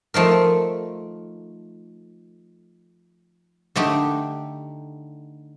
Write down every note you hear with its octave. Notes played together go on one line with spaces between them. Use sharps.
F3 A3 D#4 A#4
D3 A3 D#4 G4